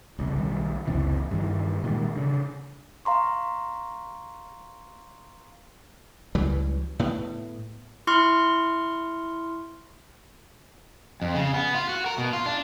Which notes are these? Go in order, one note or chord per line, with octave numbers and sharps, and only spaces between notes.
D1 C2 C#3
B1 D#3 G3
F#1 C#2 C3 E3
G2 D#3 E3
A#2 D#3 G3 G#3
C#3 D4
F5 A#5 C6 C#6
C#2 E3 F#3 G3
A2 B3
E4 C6 C#6 F6
F2
C#3
B3
F4
F#4
A#4
B2
F4
D4